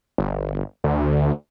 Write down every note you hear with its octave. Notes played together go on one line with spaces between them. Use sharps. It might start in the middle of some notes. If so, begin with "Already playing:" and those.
G1
D2